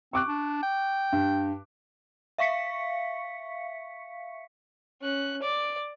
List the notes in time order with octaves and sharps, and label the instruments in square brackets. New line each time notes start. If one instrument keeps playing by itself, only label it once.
[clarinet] C4 [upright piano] C#6 D6 F#6
[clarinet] D4
G5
[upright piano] G2
[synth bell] E5 F5 C#6 B6 C#7
[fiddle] C#4 F#6
D5 D6